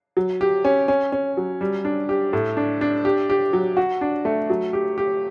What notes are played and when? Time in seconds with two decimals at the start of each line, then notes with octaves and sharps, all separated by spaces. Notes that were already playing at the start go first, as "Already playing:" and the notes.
0.17 F#3
0.41 G4
0.65 C#4
0.88 C#4
1.12 C#4
1.37 F#3
1.61 G3
1.85 D4
2.09 G4
2.33 A2
2.57 D4
2.81 D4
3.05 G4
3.30 G4
3.53 F#3
3.77 F#4
4.01 D4
4.25 A3
4.50 F#3
4.73 G4
4.98 G4